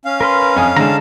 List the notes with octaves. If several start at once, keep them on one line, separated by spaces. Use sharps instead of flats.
C#4 F5
A#4 B4 C6
F2 G#5 D#6
D3 G#3 A5 A#5